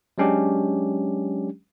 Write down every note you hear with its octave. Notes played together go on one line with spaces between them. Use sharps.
F#3 G#3 C#4 D4 G4